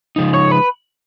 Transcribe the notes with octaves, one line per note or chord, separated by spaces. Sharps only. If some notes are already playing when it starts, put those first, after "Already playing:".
C#3 F3 G#3 D#4
C#5
B4